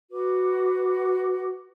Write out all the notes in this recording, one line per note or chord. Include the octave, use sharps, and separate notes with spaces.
F#4 B4 D6